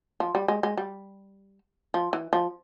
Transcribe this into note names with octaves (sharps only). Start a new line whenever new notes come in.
F3
G3
G#3
G#3
G3
F3
E3
F3